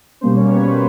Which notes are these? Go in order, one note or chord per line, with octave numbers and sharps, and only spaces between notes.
B2 G3 A#3 C#4 C5
C#5
B4
C5